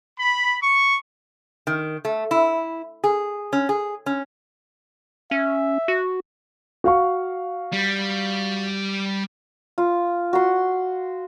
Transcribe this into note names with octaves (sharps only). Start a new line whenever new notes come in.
B5
C#6
D#3
A3
E4
G#4
C#4
G#4
C#4
C#4 E5
F#4
F#4 F5 C#6
G3
F4
F#4 C6